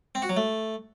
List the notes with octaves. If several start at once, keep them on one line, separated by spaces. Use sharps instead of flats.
C4
F#4
F#3
A3